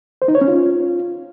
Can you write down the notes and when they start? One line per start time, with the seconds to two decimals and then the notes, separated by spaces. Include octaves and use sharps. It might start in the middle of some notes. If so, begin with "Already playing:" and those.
0.22 C5
0.28 D#4
0.35 C#5
0.41 C#4
0.48 F4